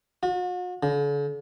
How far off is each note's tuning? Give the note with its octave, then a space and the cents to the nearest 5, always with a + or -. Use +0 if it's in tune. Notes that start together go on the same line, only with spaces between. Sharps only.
F#4 -45
D3 -45